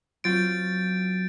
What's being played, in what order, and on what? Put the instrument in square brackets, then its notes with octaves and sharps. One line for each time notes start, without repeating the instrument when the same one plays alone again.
[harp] F#3 C4 F4 [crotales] G6 A6 D7